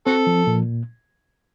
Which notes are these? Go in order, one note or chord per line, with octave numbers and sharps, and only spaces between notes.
C4 F#4 A4
F3
A#2